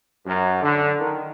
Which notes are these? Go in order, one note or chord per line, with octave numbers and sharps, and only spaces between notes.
F#2
D3
D#3